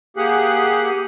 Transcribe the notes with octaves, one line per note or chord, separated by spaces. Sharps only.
A#3 G4 G#4 F#5